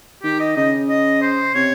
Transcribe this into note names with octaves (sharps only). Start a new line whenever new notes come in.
D#3 G4
D#5
C#3 D#5
D#5
C5
C3 C#5